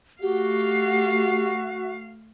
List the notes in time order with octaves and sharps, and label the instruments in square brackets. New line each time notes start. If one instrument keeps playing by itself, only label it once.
[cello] A3 F5 [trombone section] F#4 [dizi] G4